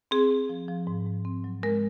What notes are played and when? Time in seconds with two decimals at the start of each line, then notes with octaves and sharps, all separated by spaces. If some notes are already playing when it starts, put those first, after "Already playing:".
0.11 C4 G#4
0.31 C4
0.49 F3
0.68 F3
0.87 G#2
1.06 G#2
1.25 C4
1.44 F#3
1.63 G#3 A#4